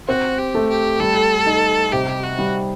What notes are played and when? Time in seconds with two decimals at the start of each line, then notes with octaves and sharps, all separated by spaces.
0.08 C4 F#4
0.39 G4
0.55 A3
0.70 G4
1.00 G3 A4
1.46 D#4
1.92 C3 G4
2.23 F#4
2.39 G3